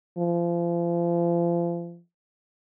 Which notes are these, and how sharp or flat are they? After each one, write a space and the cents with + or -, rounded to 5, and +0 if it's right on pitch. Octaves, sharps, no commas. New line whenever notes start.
F3 -35